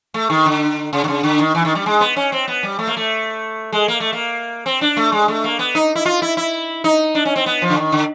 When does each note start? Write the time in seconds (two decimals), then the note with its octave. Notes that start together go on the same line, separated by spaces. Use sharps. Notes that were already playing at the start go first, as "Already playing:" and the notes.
0.14 A3
0.30 D#3
0.46 D3
0.93 C#3
1.04 D3
1.08 C#3
1.23 D3
1.39 D#3
1.55 E3
1.65 D#3
1.75 G3
1.86 G#3
2.01 B3
2.16 C#4
2.32 C4
2.48 B3
2.63 G3
2.79 A3
2.87 A#3
2.97 A3
3.72 G#3
3.88 A#3
4.00 A3
4.13 A#3
4.66 C4
4.81 D4
4.97 A3
5.12 G#3
5.28 A3
5.44 A#3
5.59 B3
5.75 D#4
5.95 E4
6.05 F4
6.22 E4
6.37 E4
6.84 D#4
7.15 D4
7.25 C#4
7.36 C4
7.46 B3
7.62 F3
7.70 D3
7.77 D#3
7.92 D3